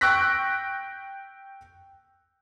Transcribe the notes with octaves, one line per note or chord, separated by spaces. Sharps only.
G5 C#6 E6 F#6 A#6 B6